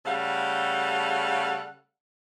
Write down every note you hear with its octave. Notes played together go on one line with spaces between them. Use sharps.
C#3 G3 A3 A4 F5 F#5